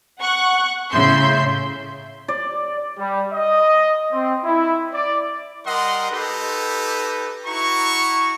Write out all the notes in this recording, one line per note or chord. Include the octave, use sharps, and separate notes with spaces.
F#5 C#6 F#6
A2 C#3 E5 C6 G6
D5
G3
D#5
C4
E4
D5
G3 A#4 D#5 F#5 C6
D#4 G4 A4 B4
E4 F#4 A#5 C#6